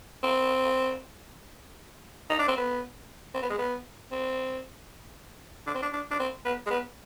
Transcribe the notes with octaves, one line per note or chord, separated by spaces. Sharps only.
C4
D#4
D4
C4
B3
C4
B3
G#3
B3
C4
D4
C4
D4
D4
D4
C4
B3
G#3
B3